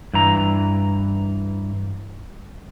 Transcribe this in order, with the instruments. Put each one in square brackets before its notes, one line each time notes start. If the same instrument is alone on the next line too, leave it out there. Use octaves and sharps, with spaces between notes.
[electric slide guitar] G2 E3 A#5